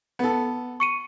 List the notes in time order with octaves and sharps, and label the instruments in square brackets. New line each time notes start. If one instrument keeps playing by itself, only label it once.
[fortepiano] B3 A4
[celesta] C#6 C#7 D#7